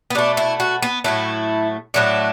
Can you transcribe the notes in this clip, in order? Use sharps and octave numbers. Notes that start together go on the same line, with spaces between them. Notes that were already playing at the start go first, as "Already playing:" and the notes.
B3
B2 A3 D4
E4
F#4
B3
A2 F#3 A3 E4
A2 F#3 A3 D4